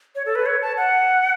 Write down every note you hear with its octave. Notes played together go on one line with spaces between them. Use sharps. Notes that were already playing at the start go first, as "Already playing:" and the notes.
C#5
A4
B4
C#5
A5
F#5